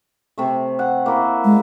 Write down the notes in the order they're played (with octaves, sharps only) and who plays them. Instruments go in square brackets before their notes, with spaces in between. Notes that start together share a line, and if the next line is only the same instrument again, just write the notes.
[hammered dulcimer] C3 A3
F#5
A#3 E4 C5
[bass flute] G#3